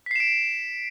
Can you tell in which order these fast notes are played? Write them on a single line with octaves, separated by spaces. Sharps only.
B6 C7 E7 D7